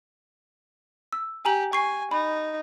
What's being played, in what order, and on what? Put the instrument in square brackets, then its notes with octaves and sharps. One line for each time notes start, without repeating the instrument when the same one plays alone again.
[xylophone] E6
[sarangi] G4 [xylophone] G#5 A#5 F#7
[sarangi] G#5 [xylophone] C#6 C7
[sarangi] D#4 [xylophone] B5